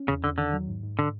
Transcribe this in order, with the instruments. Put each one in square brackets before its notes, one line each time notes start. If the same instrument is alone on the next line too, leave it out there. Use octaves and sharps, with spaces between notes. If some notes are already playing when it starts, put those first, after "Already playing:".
Already playing: [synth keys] C#4
[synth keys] E2 [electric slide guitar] C#3
[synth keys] E2 [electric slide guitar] D3
[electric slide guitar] D3 [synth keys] D#3
[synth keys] F#3
G#2
G#2
[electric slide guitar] D3